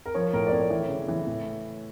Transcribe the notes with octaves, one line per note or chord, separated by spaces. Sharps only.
A#4
F3 C#5
A2 A#4
D5
A2 C#5
E3
C#3
E3
A2